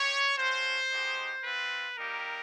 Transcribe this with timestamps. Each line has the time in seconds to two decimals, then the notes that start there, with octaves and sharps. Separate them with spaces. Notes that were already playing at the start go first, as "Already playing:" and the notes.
Already playing: G4 C#5
0.36 A3 C#4 F#4 C5
0.90 G#3 B3 D#4 G4
1.44 C4 F4 B4
1.97 G3 A#3 D#4 G4 A#4